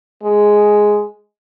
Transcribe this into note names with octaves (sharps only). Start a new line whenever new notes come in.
G#3